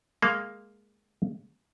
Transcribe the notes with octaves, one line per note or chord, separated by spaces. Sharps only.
G#3 A#3 F5